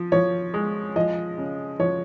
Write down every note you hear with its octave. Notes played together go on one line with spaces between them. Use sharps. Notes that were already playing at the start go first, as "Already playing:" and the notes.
Already playing: F3
F3 C#5
G#3
F3 D#5
C#3
F3 C#5